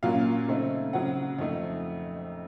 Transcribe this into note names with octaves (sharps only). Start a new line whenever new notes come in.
A#2 F#3 A#3 C#4 F5
C#3 A3 C4 D#4
C#3 F#3 C4 F#5
F2 D#3 A3 D#4